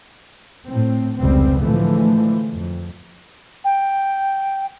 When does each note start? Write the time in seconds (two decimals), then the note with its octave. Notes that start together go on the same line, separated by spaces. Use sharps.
0.66 A2 C4
1.18 F1 C#2 G3 C4
1.60 A2 D3 E3 F3 G#3 A3
2.51 F2
3.64 G5